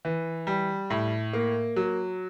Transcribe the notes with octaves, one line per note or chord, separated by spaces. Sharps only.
E3
G3
A2
A#3
F#3